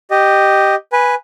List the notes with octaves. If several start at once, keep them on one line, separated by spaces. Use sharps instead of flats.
G4 D#5
B4 G#5